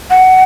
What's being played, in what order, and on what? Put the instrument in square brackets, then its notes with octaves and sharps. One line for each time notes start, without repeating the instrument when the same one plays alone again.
[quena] F#5